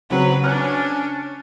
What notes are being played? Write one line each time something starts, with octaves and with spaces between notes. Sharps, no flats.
C#3 F#3 C4 B4
C#4 D4 F6 F#6